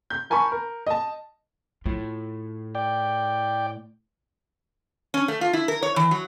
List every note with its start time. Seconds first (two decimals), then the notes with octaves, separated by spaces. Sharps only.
0.10 G6
0.30 A#4 G#5 A5 B5 C#6
0.52 A#4
0.87 D#5 A5
1.86 A2 F4
2.75 D5 G5
5.14 C#4
5.28 A3
5.41 F4
5.53 E4
5.68 A#4
5.83 C#5
5.96 E3
6.11 F#3